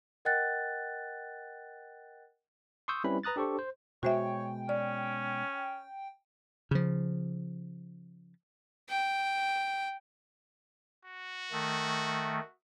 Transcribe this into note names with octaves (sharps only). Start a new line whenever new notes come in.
A#4 D#5 F#5 G5 F#6 A6
C6 C#6 D#6 E6 G6
G3 C4 C#4 E4 B4 B5
B4 A#5 D#6 F#6 A6
D4 G4 A4 C5 C#6
C5
B2 G#3 F#4 C5 C#5 E5 G5
C#4 D5
C#3 F3
G5
F#4
D#3 A3